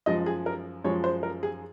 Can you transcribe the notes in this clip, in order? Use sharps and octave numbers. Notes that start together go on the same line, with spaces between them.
F#2 F3 G#3 D#5
G#4
A#4
F#2 F3 G#3 C#5
C5
A#4
G#4